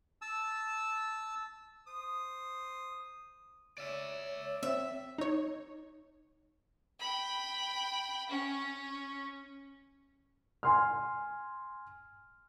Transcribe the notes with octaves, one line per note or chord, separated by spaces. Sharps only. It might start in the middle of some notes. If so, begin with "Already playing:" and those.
A5 E6
C5 D#6
C#5 D5 E5
C4 E5
D#4 C#5
G5 B5
C#4
G#5 C6 F6